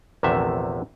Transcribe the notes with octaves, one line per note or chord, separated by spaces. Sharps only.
A#1 E2 C3 D#3 A3 E5